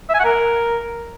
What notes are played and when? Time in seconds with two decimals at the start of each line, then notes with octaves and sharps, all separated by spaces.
0.10 E5
0.15 G#5
0.20 F#5
0.25 A#4